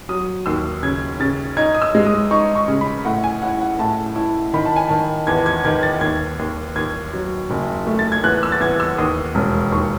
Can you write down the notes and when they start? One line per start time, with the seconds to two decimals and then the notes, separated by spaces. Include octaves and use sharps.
0.09 F#3 D#6
0.46 D#2 E6
0.83 C#3 G#6
1.20 C#3 A6
1.57 D#4 G#6
1.75 D#6
1.82 E6
1.95 G#3
2.07 D#6
2.31 D#4 C#6
2.55 C#6
2.68 C#3
2.81 B5
3.05 A2 F#5
3.24 G#5
3.42 E4 F#5
3.61 F#5
3.79 A2 A5
4.16 E4
4.53 D#3 B5
4.66 A5
4.76 G#5
4.88 D#3 A5
5.27 E2 G#6
5.46 G#6
5.65 D#3 G#6
5.83 A6
6.01 D#2 G#6
6.39 D#2
6.76 D#2 G#6
7.13 F#3
7.50 F#1
7.87 A3
7.99 A6
8.12 G#6
8.23 E2 F#6
8.43 E6
8.52 A6
8.60 E2 G#6
8.80 E6
8.98 D#2 D#6
9.35 E1
9.72 D#2 C#6